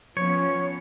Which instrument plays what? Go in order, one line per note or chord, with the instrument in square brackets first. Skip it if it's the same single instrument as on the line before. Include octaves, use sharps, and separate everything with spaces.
[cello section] F3 B3 C#4 [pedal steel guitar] C#5